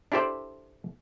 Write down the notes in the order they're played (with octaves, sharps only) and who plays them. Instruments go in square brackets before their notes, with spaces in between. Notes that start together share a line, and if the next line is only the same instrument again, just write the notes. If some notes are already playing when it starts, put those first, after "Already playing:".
[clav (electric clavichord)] D4 E4 G4 A4 C5 D5